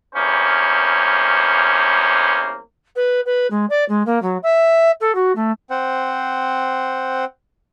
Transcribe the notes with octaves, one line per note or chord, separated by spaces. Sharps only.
E2 G2 A#3 C#4 C5
B4
B4
G#3
D5
G#3
A#3
F#3
E5
A4
F#4
A3
C4 C5 F#5